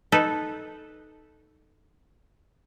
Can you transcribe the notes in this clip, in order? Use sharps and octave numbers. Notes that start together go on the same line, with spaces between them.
D#4 A4 B4